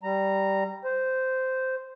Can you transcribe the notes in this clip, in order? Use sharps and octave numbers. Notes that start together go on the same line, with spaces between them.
G3 A#5
C5